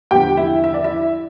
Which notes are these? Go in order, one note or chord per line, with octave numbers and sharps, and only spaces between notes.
E2 D3 F3 G4 G5
E4 E5
E5
D5
E4 E5